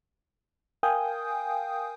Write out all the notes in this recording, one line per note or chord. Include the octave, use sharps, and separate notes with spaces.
A#4 F5 G5 G#5 D#6 G6